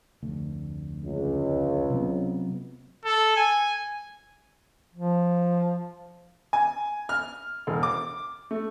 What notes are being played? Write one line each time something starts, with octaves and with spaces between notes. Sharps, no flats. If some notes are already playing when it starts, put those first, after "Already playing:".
F1 D2
C#2
C3 F#3 B3
A4
G#5
F3
G#5
F6
E1
D6
A3